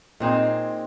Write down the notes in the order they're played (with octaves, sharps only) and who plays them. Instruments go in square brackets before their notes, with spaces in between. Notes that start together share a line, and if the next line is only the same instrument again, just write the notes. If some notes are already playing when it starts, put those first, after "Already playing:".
[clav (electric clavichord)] A#2 [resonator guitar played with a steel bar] G#3 C4 D#4